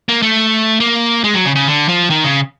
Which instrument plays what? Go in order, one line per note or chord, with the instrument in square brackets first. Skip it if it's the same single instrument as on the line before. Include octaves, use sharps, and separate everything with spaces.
[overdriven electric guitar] A#3
A3
A#3
G#3
F#3
C#3
C#3
D3
F3
D#3
C#3